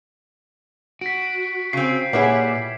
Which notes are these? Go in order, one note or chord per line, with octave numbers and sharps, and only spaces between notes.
F#4 B6 D7
C#3 C4 C7
A#2 G3 E4 G#4 B4 C#5 F#5